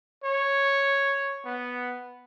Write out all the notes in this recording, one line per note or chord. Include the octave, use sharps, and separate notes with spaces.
C#5
B3